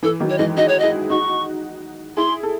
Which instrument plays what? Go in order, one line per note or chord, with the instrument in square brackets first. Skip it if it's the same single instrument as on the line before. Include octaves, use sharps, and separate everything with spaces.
[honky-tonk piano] E3 [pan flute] A4
[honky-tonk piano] D#3 F#3
[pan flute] C#5
[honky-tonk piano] E3 G#3 [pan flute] D#5
[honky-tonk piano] D#4 F#4 [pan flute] D#5
[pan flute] C#5
[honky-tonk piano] E4 G#4 [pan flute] D#5
[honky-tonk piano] D#4 F#4 [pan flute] C#6
[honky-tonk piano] E4 G#4 [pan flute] C6
[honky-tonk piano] A4